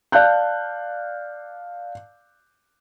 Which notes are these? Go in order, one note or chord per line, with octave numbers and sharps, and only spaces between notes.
D5 F5 A5 F#6 G6